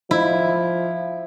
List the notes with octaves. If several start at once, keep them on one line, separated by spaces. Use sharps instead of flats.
F3 E4